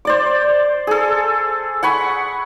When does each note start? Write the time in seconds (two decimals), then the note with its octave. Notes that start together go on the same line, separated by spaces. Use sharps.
0.05 C5 D5 D6
0.87 G#4 A4
1.83 F#5 G#5 B5 C#6